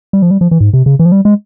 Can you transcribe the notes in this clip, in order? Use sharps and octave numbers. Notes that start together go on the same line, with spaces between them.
G3
F3
G3
F3
E3
G#2
C3
C#3
E3
F3
G3
G#3